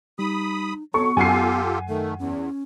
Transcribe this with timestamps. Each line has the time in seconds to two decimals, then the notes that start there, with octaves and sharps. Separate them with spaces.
0.19 G3 D#4 B5 D#6
0.94 F#3 B3 A4 C#6
1.17 F#2 F4 G4 A4 F#5 G#5 C7
1.89 D#3 A3 A4
2.19 E2 C#4